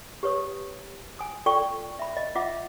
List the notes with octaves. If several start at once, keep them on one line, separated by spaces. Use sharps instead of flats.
G4 B4 C#5 D#6
G#5 D#6
F4 A4 D5 G5 C#6
E5 B5
D#5
F4 D#5 E5 F#5 D6